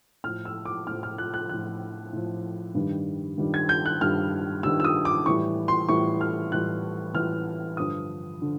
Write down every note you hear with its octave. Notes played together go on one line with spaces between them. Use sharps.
A2 F3 F6
E6
D6
A2 F3 F6
F6
F#6
F#6
A2 F3 F#6
A2 F3
G2 D#3 G3
G2 D#3 G3
G#6
G6
F#6
G2 D#3 G3 F6
G2 D#3 G3 E6
E6
D#6
D6
A2 E3 G3 C#6
C6
A2 E3 G3 C#6
F6
A2 E3 G3 F#6
A2 E3 G3 F6
G2 D3 F3 D#6
D3 F3